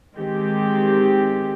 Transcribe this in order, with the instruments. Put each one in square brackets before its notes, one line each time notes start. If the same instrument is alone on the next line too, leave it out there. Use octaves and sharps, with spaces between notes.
[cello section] D#3 G#3 C4 G4